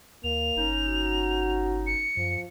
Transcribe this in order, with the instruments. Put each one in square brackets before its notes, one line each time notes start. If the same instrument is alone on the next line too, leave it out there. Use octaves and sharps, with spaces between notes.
[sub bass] D#2 [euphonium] A#3 [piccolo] F7
[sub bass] G1 [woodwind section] C#4 D#4
[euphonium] F#4
[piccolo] C#7
[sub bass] F#2 [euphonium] F3